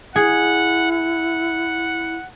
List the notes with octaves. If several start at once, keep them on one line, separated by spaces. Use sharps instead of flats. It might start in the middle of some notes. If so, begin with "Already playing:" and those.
E4 G#4 F#5
F#5